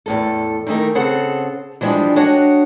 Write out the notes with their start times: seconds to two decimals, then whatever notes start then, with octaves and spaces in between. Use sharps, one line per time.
0.06 E2 A2 A4
0.67 D#3 E3 A3 D#4 A#4
0.95 C#3 C4 G#4 A4 F#5
1.81 E3 F3 G3 G#3 D4
2.16 D4 F#4 C#5 D#5 F#5 G5